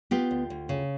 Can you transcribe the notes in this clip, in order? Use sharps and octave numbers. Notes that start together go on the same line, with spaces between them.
B3 F4 G4
D2
D2
C#3